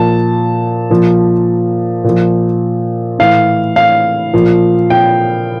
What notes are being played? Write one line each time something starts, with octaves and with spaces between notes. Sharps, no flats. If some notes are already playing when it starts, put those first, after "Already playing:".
Already playing: A#2 F3 A5
A#2 F3
A#2 F3
A2 E3 F5
F5
A#2 F3
G5